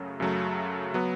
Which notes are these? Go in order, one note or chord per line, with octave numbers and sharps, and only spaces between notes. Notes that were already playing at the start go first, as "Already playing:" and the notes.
Already playing: F#2 C#3 F#3 A3
F#2 C#3 F#3 A3
F#3 B3